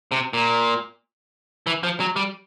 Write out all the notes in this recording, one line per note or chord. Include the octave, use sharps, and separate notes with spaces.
C3
A#2
E3
F3
F#3
G3